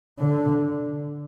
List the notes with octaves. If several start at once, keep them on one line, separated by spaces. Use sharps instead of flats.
D3